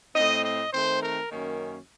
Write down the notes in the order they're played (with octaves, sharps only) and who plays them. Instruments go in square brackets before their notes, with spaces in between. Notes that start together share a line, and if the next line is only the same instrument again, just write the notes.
[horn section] A2 A3 C4 D#5
D#5
D#3 A3 C4 C5
A#4
F#2 D#3 A#3 C#4